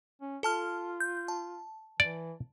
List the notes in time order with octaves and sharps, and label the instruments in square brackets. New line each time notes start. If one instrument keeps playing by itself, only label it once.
[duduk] C#4
[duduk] F4 [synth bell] A4 A5 F6
[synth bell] G6
A5
[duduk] E3 [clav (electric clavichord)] D5